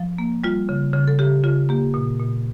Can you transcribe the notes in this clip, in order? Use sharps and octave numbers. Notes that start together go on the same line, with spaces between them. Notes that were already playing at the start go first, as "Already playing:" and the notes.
Already playing: F3
A#3
G3 F4
C#3
C#3
A4
C#3 G4
C#3 F4
A#3 G4
A#2
A#2